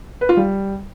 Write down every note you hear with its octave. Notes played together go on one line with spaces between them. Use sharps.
B4
F4
G3